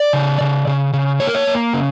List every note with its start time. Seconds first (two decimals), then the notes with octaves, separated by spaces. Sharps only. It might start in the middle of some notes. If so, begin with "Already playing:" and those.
Already playing: D5
0.13 C#3
0.41 C#3
0.67 C#3
0.93 C#3
1.20 A#3 C#5
1.27 A#4
1.35 C#5
1.47 A#3
1.74 C#3